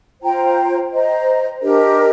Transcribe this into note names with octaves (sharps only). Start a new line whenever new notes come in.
F4 C5 G5 A#5
C5 D#5 A#5
D4 G4 A#4 D#5